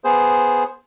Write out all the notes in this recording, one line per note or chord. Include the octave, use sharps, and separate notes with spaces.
B3 G#4 C5